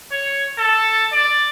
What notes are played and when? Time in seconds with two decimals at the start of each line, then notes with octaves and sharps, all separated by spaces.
0.12 C#5
0.58 A4
1.13 D5